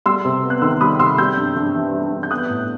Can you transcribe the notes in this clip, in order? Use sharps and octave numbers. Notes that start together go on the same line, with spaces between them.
G3 C6 E6
C3
B3
F#6
D#3 C6 E6
G3 B5 D#6
C3 C6 E6
G3 E6 G6
G2
G2
E3
G3
G2
G6
B3 D#6 F#6
A2